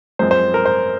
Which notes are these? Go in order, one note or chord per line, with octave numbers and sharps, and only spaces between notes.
F#2 F3 G#3 C4 F4 C5
C5
A#4
C5